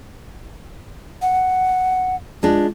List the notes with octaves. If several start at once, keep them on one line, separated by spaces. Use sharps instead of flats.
F#5
G#3 D4 F4